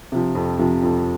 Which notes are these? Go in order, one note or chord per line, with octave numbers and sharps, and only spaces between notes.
C3 F3
F2
C3 F3
F2